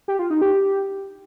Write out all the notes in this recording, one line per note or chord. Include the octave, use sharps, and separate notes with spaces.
G4
F4
D#4
G4